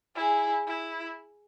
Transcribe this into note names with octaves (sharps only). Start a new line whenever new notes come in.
E4 G#4
E4